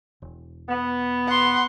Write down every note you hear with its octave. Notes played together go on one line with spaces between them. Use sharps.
E1
B3
F#5 C6